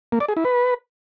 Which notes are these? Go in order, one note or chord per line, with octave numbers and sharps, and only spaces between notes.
A#3
D5
G#4
E4
B4